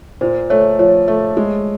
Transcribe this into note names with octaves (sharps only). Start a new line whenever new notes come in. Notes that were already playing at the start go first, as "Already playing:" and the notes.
A#2 C5
A3 C#5
F3 C#5
A3
G#3